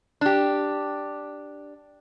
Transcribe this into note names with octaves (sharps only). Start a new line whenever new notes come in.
D4 G4